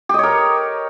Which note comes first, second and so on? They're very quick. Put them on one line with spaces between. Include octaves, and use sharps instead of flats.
G4 D#5 C#5 A#4